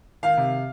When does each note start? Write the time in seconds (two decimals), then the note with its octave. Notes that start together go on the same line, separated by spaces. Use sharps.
0.23 D#3 F5
0.37 C3